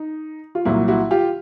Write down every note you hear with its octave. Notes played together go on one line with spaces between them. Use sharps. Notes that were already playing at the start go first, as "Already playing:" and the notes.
Already playing: D#4
F4
C2 A#2 F#3 E4
E4 F#4
F4 G4